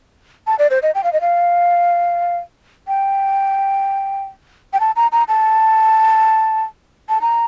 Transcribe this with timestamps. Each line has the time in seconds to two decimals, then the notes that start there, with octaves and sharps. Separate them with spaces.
0.47 A5
0.59 D5
0.70 C5
0.82 D#5
0.95 G5
1.04 F5
1.13 D#5
1.21 F5
2.88 G5
4.73 G5
4.80 A5
4.96 A#5
5.12 A#5
5.28 A5
7.09 A5
7.21 A#5